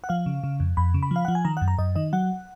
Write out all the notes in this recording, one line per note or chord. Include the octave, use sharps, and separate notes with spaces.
F#5
F3 F5
C#3
C#3
F2
F2 B5
C#3
B5
F3 F5
F3 F#5
G#5
D#3 A#5
F#5
F#2
A#5
F#2 D#5
D#3 D#5
F#3 F#5